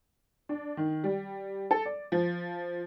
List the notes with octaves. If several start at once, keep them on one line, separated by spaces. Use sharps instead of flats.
D4
D#3
G3
A4
D5
F3